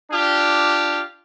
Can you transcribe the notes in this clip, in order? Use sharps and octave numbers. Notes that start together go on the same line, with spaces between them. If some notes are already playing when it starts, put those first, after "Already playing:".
D4 F4 G4